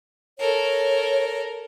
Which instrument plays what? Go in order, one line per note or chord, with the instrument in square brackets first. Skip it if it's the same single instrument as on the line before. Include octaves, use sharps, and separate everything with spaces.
[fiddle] A4 A#4 [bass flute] C#5